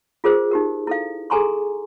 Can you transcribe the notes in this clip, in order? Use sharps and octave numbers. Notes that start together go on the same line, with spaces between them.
F4 G#4 A#4 C5
D#4 G4 A#4
E4 A4 F5
G#4 A4 G#5 A#5 C6 C#6